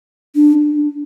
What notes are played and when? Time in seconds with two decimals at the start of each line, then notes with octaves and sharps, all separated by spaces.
0.36 D4